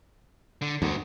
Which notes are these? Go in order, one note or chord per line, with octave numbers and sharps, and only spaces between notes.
D3
D2 G2 F#4